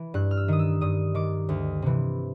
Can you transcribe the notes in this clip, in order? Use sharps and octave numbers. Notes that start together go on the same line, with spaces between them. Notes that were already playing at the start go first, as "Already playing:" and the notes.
Already playing: E3
G2 F#6
F6
E6
D#3 D#6
E6
G2 D#6
D#3 D6
D2
C3 E3